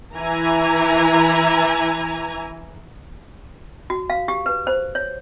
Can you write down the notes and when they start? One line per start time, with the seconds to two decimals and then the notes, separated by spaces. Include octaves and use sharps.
0.16 E3 E4 G#5 A#5
3.90 F#4
4.10 F5
4.28 G4
4.46 B4
4.67 C5
4.95 C#5